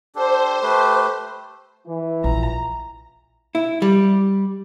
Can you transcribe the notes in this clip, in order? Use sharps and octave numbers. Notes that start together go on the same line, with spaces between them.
D4 G4 A4 C5
A3 G4 B4
E3
A#1 A#5
E4
G3